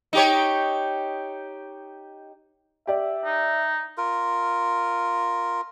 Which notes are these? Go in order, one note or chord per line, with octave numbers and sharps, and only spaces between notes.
D#4 G4 C#5
G4 D5 E5
D#4
F4 A#4